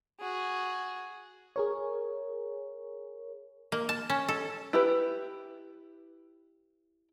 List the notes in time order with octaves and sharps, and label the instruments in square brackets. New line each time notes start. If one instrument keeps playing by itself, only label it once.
[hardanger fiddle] F#4 G#4
[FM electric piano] G#4 A#4 C#5
[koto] A#3
A5
C#4
A4
[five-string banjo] E4 G4 B4